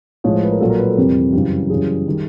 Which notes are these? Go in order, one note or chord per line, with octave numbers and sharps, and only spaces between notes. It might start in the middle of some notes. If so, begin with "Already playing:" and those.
A2 F3 G#3 C#5
C5
B4
A#4
A#2 F#3 A4
A#4
B4
A4
F2 C3 E3 G3 A#4
F#2 C#3 E3 G3
F#2 C#3 E3 G3 G#4
D#3 G3